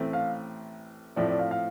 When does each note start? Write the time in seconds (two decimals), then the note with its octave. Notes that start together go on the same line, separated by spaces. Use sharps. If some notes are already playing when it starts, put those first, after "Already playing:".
Already playing: A1 A2 A3 C4
0.13 F5
1.16 A2 F3 A3 C4 D5
1.28 D5
1.39 F5
1.51 F5